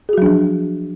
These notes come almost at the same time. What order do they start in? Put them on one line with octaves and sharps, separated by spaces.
G#4 F#4 F#3 D4 F3